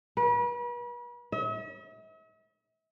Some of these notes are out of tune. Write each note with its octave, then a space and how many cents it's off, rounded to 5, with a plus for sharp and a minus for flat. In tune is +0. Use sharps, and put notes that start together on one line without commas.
B4 -40
E5 -45